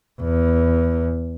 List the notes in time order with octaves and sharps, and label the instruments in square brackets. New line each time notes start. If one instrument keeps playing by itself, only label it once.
[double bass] E2